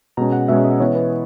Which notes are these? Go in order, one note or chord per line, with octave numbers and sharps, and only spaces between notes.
B2 G#3 C#4 A#5
F#5
B2 G#3 C#4 E5
D#5
E3 B3 E4 C#5
B4